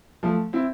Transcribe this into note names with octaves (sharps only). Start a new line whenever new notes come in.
F3 A3
C4 E4